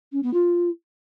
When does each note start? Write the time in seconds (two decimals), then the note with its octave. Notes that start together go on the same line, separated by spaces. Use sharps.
0.12 C#4
0.23 B3
0.33 F4